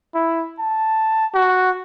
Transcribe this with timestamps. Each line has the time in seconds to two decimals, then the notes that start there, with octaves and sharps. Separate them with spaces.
0.15 E4
0.59 A5
1.34 F#4